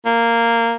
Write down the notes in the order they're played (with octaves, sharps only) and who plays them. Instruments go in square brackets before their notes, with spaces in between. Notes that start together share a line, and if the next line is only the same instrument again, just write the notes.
[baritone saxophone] A#3